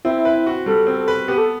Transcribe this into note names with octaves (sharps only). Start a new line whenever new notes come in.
C4 E4
B4
F#4
G3 A4
C4
B4
B3 G4
A4